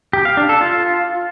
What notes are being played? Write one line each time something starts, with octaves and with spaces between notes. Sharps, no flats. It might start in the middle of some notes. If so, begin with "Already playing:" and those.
G4
F5
D4
A4
F4